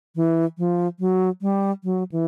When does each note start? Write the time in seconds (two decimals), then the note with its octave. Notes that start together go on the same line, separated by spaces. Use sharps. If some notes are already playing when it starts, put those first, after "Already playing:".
0.16 E3
0.58 F3
1.00 F#3
1.42 G3
1.84 F#3
2.12 E3